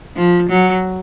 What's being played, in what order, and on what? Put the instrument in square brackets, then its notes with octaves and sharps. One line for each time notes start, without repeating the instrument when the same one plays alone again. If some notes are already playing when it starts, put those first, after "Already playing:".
[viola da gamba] F3
F#3